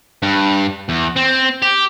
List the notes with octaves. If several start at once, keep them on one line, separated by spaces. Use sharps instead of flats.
G2
E2
C4
G4